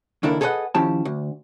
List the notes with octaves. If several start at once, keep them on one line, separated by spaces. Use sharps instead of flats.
D#2 C#3 D4 E4 A4 A#4
G#4 A4 B4 C#5 D#5 F#5
D#3 F3 C#4 E4 G4 A5
D2